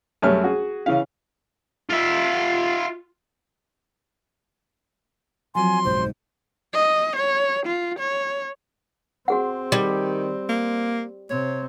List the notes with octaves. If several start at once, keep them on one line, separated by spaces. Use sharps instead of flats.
F#2 F#3 G3 A3 F6
F#4 G#4
C#3 E3 F5
F4 E5
F3 F#3 C4 G#5 C6
F#1 B1 G#2 C5
D#5
C#5
F4
C#5
C4 F#4 G#4 F#5
D#3 G3
A#3
C3 C4 C#5